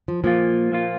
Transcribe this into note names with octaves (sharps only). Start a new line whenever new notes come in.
F3
A#2 F3 A#3 F4
A#2 A#3 F4